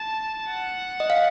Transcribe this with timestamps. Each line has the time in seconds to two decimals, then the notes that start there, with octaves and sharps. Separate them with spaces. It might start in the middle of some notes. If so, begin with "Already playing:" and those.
Already playing: A5
0.49 F#5
1.00 D#5
1.10 F5